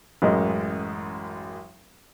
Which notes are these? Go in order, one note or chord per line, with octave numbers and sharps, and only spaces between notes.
A1 F#2 G#3 A#4 D#5